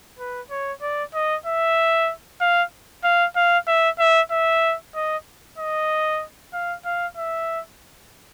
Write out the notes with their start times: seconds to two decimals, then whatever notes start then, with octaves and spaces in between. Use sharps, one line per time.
0.19 B4
0.50 C#5
0.82 D5
1.14 D#5
1.46 E5
2.41 F5
3.04 F5
3.36 F5
3.68 E5
3.99 E5
4.31 E5
4.95 D#5
5.58 D#5
6.53 F5
6.85 F5
7.16 E5